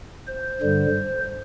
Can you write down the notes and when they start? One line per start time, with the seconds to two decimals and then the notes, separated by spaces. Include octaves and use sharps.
0.28 C5
0.62 G2 D3 G3